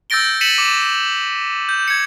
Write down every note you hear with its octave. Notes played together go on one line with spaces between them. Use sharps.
E6 G6 A6 A#6 D7 G7
A6 B6 C#7 D#7 E7 F#7
D6 A6
G6
G#6 C#7